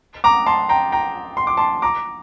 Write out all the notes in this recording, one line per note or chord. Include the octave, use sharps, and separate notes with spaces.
A#5 D6
A5 C6
G5 A#5
G5 A#5
C6
D6
A5 C6
A#5 D6